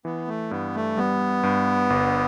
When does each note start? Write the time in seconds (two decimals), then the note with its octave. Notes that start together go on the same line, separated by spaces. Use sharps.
0.05 E3 B3
0.27 A3
0.51 G2 B3
0.75 A3
0.97 G3 B3
1.43 G2
1.90 G1